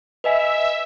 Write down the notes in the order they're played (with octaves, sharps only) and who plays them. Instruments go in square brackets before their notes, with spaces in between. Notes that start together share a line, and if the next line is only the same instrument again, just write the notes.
[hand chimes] B4 D#5 G#5 [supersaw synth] E5